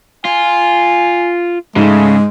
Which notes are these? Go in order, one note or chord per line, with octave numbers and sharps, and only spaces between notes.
F4 G#5
G#2 C#3 G#3 A3